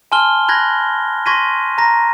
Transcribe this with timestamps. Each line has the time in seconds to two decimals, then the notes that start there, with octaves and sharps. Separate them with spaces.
0.12 G#5 A5 C6 F6 G7
0.48 B5 F#6 G#6 A#6
1.26 C6 C#6 G#6 A#6 B6 D#7
1.78 A#5 A#6